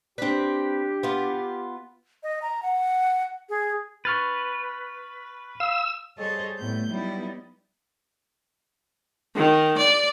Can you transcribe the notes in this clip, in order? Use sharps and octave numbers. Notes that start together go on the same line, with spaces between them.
C4 D4 G4 B4 D5
B3 F4
D#5
A#5
F#5
G#4
B4 C#6 F6 A6
F5 E6
G3 G#4 A4 C5 C#5 D#5
A2 G3 A3 B3 G6
F#3 G3 B3 D#4 E4
D#3
D5